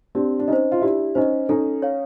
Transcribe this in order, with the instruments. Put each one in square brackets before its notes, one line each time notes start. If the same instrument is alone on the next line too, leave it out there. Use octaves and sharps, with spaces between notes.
[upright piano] C4 D4 [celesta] G4
[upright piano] D4
[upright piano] C#4 D#4 [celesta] C5 D#5
[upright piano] F4
[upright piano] D4 E4 [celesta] G4
[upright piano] C#4 D#4 [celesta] C5 D#5
[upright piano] C#4 D#4 [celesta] A4
[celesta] C#5 F5